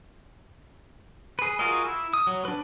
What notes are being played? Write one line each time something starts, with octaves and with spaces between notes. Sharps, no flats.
G#4 B4
F4 F#4 G#4 A#4 D#5
E4
D#6
F#3
D4 B4